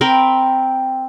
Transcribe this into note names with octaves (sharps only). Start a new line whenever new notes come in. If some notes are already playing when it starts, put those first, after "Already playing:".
C4 A#4 G5 B5